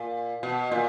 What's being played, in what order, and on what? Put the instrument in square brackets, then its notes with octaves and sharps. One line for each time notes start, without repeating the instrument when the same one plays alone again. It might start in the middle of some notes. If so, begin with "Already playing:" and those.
Already playing: [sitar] A#2
B2
A#2